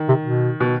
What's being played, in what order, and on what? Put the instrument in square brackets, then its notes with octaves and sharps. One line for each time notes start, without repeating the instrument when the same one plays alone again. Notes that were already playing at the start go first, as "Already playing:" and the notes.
Already playing: [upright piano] D#3
[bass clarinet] C3
B2
[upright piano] B2